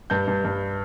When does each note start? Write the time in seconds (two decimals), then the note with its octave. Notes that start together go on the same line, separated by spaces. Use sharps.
0.10 G2 G6
0.28 G2
0.45 G2